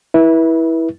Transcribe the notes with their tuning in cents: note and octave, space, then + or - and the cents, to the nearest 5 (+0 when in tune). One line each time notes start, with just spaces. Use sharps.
E4 -15 B4 -30